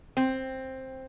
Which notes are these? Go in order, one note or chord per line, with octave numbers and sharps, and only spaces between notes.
C4